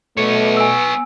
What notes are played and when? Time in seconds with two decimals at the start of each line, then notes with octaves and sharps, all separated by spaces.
0.17 B2 A3 B3 C#5
0.57 G#5 E6